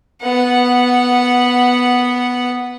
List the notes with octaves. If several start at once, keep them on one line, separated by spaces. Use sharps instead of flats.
B3 F#5